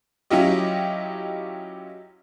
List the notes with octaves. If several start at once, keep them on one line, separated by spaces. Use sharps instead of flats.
F#3 C#4 E4 F4 G4 D#5